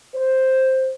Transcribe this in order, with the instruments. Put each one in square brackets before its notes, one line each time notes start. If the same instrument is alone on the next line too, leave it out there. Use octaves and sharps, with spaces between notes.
[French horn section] C5